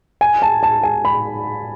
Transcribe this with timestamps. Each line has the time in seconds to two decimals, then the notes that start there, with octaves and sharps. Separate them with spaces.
0.21 G#5
0.42 A5
0.63 A5
0.83 G#5
1.05 B5